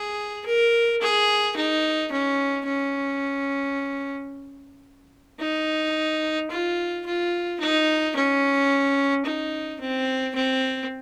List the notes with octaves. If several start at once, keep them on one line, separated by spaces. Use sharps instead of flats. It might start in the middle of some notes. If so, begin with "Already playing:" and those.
Already playing: G#4
A#4
G#4
D#4
C#4
C#4
D#4
F4
F4
D#4
C#4
D#4
C4
C4